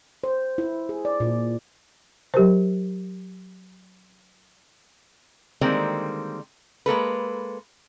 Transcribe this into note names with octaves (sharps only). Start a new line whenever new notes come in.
C5
E4
G#4
D5
A#2
F#3 G4 A#4 C5
D3 D#3 G3 G#3 A#3 C4
G#3 A#3 A4 B4